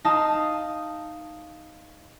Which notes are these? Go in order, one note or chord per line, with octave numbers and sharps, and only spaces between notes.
D#4 F5 A5 D#6